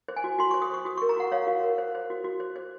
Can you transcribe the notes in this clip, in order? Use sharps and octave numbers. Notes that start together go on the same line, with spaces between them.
C5
G#5
F#4
F#4 C6
C#6
C5
D#6
C5 C#6
F#4 D#6
C#6
A#4
A#5
F#4 F#5
C#5 F5
F#4
A#4
C5
C5
F#4
F#4
C5
C5